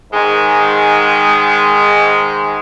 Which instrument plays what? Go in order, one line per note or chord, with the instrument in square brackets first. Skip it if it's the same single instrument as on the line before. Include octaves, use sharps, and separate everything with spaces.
[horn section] G#2 D#3 G#3